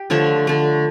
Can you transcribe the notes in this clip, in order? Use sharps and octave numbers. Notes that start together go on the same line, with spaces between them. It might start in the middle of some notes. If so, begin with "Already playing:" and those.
Already playing: G4
D3 F3 A3 C#5 E5
D3 A3